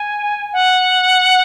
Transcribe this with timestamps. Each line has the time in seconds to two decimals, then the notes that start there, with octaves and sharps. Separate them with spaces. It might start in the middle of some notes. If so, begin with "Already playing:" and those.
Already playing: G#5
0.53 F#5